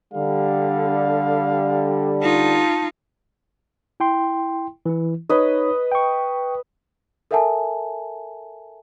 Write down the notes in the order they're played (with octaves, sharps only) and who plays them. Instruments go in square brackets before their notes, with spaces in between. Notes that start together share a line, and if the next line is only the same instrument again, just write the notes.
[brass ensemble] D3 G3 [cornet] F5
[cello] D#4 F4 [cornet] A5
[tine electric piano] E4 G5 C6
E3 E4
[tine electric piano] D#4 C#5 [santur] B4 D#5
[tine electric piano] G5 C#6
[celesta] A4 A#4 E5 F#5 G#5 A5